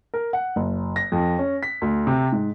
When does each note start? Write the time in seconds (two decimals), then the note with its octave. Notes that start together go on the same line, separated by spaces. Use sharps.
0.14 A#4
0.33 F#5
0.56 F#1
0.96 A#6
1.12 F2
1.39 C#4
1.63 B6
1.82 D2
2.07 C3
2.32 G#2